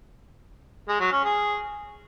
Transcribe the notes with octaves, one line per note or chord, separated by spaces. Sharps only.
G#3
F#3
C#4
G#4